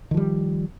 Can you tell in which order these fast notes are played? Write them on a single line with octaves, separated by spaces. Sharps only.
D#3 F3 G3